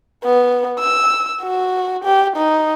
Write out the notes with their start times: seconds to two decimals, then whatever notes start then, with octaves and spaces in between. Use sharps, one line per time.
0.24 B3
0.79 E6
1.43 F#4
2.04 G4
2.37 D#4